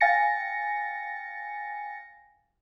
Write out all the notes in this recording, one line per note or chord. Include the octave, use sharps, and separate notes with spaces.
F5 G5 G#5 A6 A#6 C#7